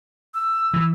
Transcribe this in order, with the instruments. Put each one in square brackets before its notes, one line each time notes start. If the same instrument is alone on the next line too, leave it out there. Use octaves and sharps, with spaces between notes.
[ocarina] E6
[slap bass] E3